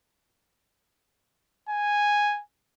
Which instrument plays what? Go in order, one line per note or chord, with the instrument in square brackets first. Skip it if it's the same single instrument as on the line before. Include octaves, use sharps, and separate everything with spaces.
[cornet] G#5